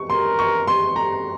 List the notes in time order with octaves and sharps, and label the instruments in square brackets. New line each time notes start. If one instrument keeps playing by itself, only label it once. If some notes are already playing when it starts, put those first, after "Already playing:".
Already playing: [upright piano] C#6
[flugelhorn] A#4 [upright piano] C6
[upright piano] C#6
C6
A#5